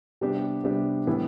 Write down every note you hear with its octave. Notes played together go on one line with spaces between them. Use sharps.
C3 G3 B3 D4 G4
C3 G3 B3 D4 G4
A2 E3 G3 B3 E4